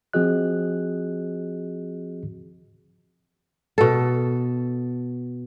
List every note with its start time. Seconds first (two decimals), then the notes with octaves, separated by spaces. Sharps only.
0.13 F3 C4 F#4 G#4 D#5 F#6
3.78 B2 A4